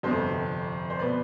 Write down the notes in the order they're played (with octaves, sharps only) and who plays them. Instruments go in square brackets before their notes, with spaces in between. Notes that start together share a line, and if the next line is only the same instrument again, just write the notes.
[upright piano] G1 F2 C3 A4 C5
C5
B2 B4 D5